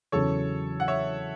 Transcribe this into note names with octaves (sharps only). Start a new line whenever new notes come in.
E2 C#3 F#3 A4 C#5
F#5
C#5 E5